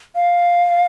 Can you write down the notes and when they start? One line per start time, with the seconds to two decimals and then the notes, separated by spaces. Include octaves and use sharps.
0.16 F5